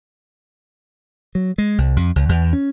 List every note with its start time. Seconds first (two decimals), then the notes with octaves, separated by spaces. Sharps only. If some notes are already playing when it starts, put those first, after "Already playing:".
1.35 F#3
1.58 G#3
1.78 C2
1.97 F2
2.16 C#2
2.29 E2
2.53 C#4